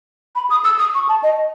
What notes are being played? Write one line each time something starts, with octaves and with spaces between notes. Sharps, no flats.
B5
D#6
E6
D#6
C#6
A5
D#5